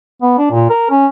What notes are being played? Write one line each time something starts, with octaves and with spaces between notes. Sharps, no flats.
B3
D4
A#2
A#4
C#4